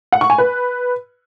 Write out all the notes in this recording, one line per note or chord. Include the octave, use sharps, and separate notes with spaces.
F#5
C#6
G#5
B4